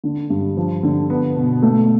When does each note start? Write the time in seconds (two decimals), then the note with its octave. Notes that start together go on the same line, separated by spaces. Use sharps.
0.04 D3
0.30 G2
0.57 F3
0.83 D3
1.10 B3
1.36 B2
1.62 A3